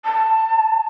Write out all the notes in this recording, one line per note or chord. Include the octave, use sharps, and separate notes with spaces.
A5